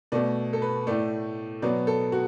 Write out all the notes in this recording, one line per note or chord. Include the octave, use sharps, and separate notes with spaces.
B2 A3 D5
A4
B4
A2 A3 D5
B2 F#3 B3 D5
A4
F#4